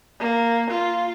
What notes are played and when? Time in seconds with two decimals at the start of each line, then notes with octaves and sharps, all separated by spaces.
0.20 A#3
0.71 F4